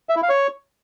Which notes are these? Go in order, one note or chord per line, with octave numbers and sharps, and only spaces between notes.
E5
E4
F5
C#5